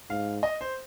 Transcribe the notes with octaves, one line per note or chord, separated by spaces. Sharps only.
G#2 F5
D#5
C5